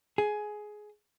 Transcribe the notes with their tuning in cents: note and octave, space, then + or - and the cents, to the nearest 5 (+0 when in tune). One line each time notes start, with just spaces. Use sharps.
G#4 +15